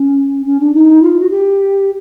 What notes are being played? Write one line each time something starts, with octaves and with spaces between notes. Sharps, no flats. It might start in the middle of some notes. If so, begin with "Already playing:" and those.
Already playing: C#4
C#4
D4
D#4
F4
F#4
G4